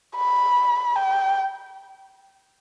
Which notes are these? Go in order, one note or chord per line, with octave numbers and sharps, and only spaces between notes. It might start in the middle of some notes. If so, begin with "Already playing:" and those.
B5
G5